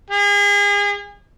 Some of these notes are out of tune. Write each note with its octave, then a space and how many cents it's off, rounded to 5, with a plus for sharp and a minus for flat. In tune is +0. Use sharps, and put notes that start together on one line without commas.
G#4 -35